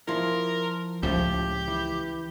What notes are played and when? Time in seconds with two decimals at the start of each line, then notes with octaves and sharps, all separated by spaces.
0.08 F3 E4 A#4
1.03 C#2 A2 F3 G4
1.68 E3